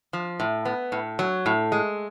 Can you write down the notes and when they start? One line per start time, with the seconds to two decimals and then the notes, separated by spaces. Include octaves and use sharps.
0.13 F3
0.40 A2
0.65 B3
0.92 A2
1.19 F#3
1.46 A2
1.72 G#3